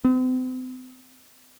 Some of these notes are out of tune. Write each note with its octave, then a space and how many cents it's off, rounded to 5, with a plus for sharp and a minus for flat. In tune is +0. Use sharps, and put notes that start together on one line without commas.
C4 -40